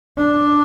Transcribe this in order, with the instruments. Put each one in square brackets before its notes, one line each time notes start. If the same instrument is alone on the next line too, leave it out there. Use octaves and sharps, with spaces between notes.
[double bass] D4